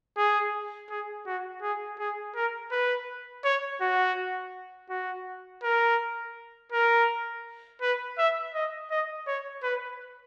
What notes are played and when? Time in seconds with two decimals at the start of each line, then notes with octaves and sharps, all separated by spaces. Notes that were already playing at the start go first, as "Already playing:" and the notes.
0.17 G#4
0.90 G#4
1.26 F#4
1.62 G#4
1.99 G#4
2.35 A#4
2.71 B4
3.44 C#5
3.81 F#4
4.90 F#4
5.63 A#4
6.72 A#4
7.81 B4
8.18 E5
8.54 D#5
8.91 D#5
9.27 C#5
9.63 B4